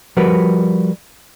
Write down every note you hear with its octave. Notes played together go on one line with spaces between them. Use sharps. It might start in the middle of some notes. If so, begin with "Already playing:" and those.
F3 G3 F#4 A#4 B4